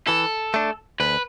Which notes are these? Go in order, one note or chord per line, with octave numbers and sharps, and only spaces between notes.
E3 A4
A3 D4
D2 B4